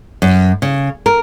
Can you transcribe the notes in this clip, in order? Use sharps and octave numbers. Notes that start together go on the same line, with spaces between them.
F#2
C#3
A#4